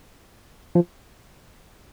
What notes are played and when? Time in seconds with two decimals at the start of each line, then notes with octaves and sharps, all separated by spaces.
0.75 F3